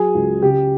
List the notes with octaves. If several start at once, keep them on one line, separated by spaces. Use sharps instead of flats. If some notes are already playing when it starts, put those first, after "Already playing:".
Already playing: F#3 G#4
C#2
C#3 G4